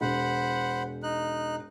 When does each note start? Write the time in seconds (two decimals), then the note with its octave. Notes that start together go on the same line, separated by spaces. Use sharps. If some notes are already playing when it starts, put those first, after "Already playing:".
0.01 E1 C5 F#5 B5
1.03 D#4 F#6